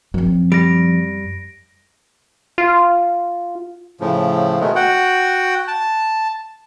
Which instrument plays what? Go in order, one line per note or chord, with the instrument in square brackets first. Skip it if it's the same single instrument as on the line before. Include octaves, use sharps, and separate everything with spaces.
[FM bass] F#2 [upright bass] F3 C4
[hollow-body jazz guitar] G3 [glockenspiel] A#6 D7
[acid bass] F4
[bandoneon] A2 C#3 F3
B2 D#3 G#3 A3
F#4 F#5 G5
A5